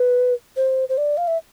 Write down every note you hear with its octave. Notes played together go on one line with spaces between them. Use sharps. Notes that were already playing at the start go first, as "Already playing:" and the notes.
Already playing: B4
C5
C5
D5
F5
E5